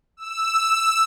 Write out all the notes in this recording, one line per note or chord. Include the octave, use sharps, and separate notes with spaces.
E6